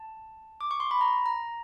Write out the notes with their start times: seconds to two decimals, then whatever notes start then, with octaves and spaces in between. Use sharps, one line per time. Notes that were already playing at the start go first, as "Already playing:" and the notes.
Already playing: A5
0.61 D6
0.71 C#6
0.80 C6
0.91 B5
1.01 A#5
1.26 A#5